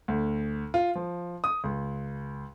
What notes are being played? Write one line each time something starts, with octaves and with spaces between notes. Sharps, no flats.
D2
F4
F3
D#6
C#2